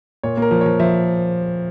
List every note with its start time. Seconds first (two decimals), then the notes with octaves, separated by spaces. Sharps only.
0.23 A#2 C#5
0.37 A#3
0.42 A#4
0.51 F3
0.61 F3 C#5
0.79 F3 E5